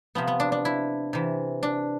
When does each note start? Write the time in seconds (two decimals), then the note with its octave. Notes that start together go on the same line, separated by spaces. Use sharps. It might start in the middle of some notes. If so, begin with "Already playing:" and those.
0.15 C3 F3 B3
0.28 B3
0.40 D4
0.52 D4
0.65 E4
1.13 C3 E3
1.63 D4